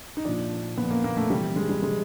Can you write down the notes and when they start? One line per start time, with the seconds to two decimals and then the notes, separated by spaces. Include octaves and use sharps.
0.17 D#4
0.25 A#2 F3 D4
0.78 A#2 F3 B3
0.91 A#3
1.04 A#3
1.17 A3
1.30 C3 E3 G3
1.56 G#3
1.69 G3
1.82 C3 E3 G#3